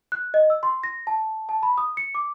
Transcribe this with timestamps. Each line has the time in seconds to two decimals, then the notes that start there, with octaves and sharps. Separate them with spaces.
0.12 F#6
0.34 D#5
0.50 E6
0.63 C6
0.83 A#6
1.07 A5
1.49 A5
1.63 B5
1.78 D#6
1.97 C#7
2.15 D6